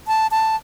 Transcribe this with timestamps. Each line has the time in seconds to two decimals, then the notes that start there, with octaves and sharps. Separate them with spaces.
0.07 A5
0.31 A5